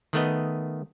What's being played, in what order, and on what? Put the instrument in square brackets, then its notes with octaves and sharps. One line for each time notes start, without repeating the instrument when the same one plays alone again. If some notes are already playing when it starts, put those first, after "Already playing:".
[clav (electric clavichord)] D#3 A3 B3 D#5